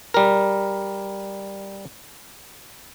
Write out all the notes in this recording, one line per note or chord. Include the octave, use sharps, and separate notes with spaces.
G3 A#4